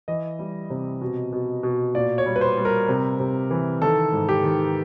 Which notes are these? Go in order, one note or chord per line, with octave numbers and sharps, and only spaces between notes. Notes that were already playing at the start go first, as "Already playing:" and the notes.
E3 D#5
G3
C3
B2
B2
B2
A#2 D5
C#5
G3
B4
C5
G3
A#4
C3
C3
E3
D#3 A4
G#2
G4
D#3